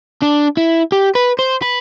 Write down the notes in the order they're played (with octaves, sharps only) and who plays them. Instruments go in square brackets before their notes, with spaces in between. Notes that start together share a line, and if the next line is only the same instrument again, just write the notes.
[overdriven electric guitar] D4
E4
G4
B4
C5
B4